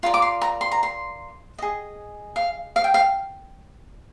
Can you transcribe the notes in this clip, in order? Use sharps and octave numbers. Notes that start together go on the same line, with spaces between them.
F4 A#4 D5
D6
C6
A#5
C6
A#5
C6
G#4 D#5
F5
F5
G5
F5